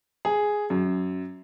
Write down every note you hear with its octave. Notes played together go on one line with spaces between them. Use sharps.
G#4
F#2